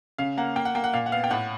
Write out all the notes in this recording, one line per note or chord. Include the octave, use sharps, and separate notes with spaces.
C#3 F5
A#3 F#5
A#3 G5
F#5
A#3 G5
F#5
A#2 F5
F#5
B3 F5
G5
A2 F#5